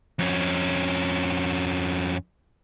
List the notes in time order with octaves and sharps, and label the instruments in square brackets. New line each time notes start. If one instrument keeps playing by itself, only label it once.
[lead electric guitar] F2 C#4